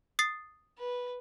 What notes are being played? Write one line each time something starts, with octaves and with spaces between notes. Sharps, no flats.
D#6 A6 C7
B4